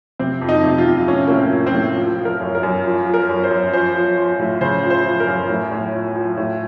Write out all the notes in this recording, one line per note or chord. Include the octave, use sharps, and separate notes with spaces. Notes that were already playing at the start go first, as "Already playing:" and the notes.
C3 C4
F2
D#4
C3
F4
C3
A2 C#4
A2 A#3
C4
F3
C4
A2
F3
F3
A#4
F#2
A#4
F#2
F3
F3
A#4
F#2
C5
F#2
F3 C5
F3
F3
A2
C#3 C5
F3
C5
F3
A#4
F#2
A2
A2
F3
F3
A2